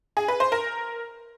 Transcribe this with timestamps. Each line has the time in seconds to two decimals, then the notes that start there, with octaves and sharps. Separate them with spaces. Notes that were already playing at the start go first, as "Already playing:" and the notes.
0.17 G#4
0.28 B4
0.40 C5
0.52 A#4